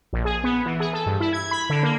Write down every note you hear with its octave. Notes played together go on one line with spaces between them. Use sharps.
A#1
G#4
B3
E3
G#4
A4
G2
E4
G#6
B5
D3
A#3